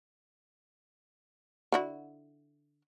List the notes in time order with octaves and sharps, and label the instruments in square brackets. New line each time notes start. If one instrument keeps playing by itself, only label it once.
[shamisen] D3 E4 F#4